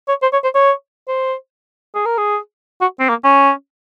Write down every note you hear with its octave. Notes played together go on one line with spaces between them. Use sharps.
C#5
C5
C#5
C5
C#5
C5
G#4
A#4
G#4
F#4
C4
A#3
C#4